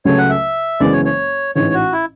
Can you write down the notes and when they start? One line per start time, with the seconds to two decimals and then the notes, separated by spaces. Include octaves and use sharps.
0.05 C#2 C#3 F#3 A3 C#4 C#5
0.18 F#5
0.30 E5
0.80 F#1 F#2 E3 G#3 B3 D5
0.92 C#5
1.05 C#5
1.55 A1 G#2 E3 C#5
1.74 F#4
1.92 E4